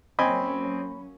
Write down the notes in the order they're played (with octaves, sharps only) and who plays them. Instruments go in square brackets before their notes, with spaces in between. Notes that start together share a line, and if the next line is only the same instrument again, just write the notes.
[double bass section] F#3 A#3 C#4 [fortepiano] C4 D#5 G#5 [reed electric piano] B5